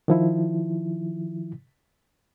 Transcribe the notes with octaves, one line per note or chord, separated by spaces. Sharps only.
D#3 F3 E4